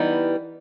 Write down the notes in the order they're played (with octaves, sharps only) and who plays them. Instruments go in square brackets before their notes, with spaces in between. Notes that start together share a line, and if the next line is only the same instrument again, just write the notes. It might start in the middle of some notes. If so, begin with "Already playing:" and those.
Already playing: [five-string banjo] E3 G3 B3 D#4